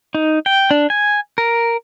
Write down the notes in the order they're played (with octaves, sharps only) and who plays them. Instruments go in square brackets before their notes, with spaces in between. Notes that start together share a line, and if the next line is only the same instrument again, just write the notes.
[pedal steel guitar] D#4
G5
D4
G#5
A#4